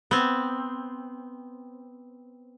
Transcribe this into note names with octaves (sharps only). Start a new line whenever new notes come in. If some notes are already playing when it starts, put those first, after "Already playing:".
B3 C4